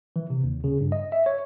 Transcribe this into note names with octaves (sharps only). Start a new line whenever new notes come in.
E3
C3
D#2
C#3
G2
D#5
E5
C#5